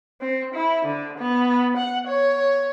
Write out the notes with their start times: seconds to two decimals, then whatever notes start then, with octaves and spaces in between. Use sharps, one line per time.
0.21 C4
0.54 E4
0.85 D3
1.19 B3
1.77 F#5
2.08 C#5